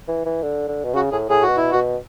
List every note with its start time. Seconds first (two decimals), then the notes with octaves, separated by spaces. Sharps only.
0.08 E3
0.26 E3
0.43 D3
0.68 D3
0.85 B2
0.94 C#3 F#4
1.12 A2 G#4
1.29 A2 G#4
1.43 B2 F#4
1.57 E4
1.71 B2 F#4